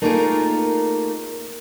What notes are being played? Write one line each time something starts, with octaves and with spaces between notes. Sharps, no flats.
A3 A#3 D#4 F4 G#4 A#4